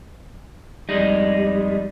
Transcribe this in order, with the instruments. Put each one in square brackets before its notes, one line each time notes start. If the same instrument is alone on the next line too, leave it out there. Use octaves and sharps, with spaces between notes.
[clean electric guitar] F2 G#3 D#4 [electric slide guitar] G3